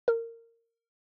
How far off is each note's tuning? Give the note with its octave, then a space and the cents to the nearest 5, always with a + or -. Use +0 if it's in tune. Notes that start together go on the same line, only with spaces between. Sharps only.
A#4 -20